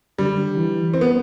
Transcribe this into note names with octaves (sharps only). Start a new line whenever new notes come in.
D3 G3
E3
C4
B3